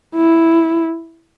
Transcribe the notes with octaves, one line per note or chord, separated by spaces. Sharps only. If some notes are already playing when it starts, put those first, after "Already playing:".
E4